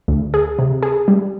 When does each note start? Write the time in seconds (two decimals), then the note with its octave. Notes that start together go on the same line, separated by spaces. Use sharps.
0.08 D2
0.34 G#4
0.59 C3
0.83 G#4
1.08 G3